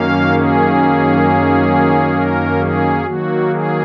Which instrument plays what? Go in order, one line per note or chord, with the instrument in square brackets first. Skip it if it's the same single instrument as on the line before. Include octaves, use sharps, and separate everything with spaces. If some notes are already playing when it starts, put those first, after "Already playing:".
Already playing: [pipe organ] F#2 D#3 A#3 C#4 F5
G#4
A#4
G#4
D#3 F#3 A#3 F#4
G#4